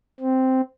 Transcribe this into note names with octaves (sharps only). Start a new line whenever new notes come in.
C4